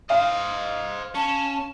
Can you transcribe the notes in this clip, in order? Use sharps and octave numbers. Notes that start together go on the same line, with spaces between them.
C5 D#5 F5
C#4 A5